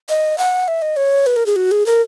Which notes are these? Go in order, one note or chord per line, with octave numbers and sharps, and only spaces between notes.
D#5
F#5
E5
D#5
C#5
B4
A#4
G#4
F#4
G#4
A#4